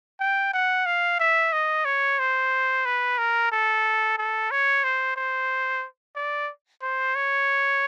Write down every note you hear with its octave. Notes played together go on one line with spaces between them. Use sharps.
G5
F#5
F5
E5
D#5
C#5
C5
B4
A#4
A4
A4
C#5
C5
C5
D5
C5
C#5